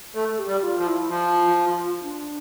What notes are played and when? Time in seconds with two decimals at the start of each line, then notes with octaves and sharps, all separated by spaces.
0.15 A3 A4
0.39 G4
0.47 G3
0.63 F4
0.78 F3
0.86 E4
1.09 F3 F4
2.03 D4